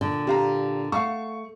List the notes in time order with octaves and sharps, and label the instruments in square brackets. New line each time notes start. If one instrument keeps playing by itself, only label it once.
[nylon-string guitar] A#2 D3
[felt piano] G4 F5 A#5
[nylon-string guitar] A3 [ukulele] F5 F#5 [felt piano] C#6